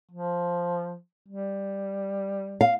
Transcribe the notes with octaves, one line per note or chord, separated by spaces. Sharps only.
F3
G3
F5